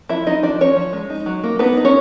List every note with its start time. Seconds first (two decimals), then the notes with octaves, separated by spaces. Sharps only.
0.09 F3 E4 E5
0.27 F3 D#4 D#5
0.43 F3 D4 D5
0.60 F3 C#4 C#5
0.77 F3
0.93 G#3
1.10 D#4
1.26 F#3
1.44 A#3
1.59 B3 D#4 B4
1.77 D#4
1.85 C#4 C#5